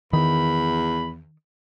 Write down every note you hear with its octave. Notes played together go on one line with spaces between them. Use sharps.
E2 D#3 B5